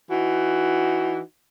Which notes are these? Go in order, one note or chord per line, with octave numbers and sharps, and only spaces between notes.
E3 D#4 F#4